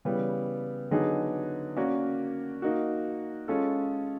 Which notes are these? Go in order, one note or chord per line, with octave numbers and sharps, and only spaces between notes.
C#3 E3 G3 B3
D3 F#3 B3 D#4 G#4
A#3 C#4 F#4 A#4 D5
A#3 D#4 F#4
G#3 C#4 F4 A4